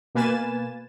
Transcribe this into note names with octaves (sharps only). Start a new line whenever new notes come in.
B2 A#3 B4 G#5 A6 E7